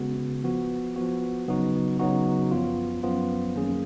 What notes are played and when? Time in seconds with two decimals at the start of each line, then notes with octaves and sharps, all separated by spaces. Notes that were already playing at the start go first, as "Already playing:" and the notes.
Already playing: C#3 G#3 B3 F#4
0.44 F3 B3 F#4
0.96 F3 B3 F#4
1.48 C#3 F#3 B3 D#4 F#4
1.99 C#3 F#3 B3 D#4 F#4
2.51 F#2 F3 B3 F4
3.03 F#2 F3 B3 F4
3.56 F#2 D#3 A#3 C#4 G#4